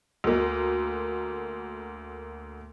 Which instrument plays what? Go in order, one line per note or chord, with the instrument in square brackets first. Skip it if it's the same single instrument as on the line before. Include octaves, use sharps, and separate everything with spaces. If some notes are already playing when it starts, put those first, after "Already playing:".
[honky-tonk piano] D2 A#3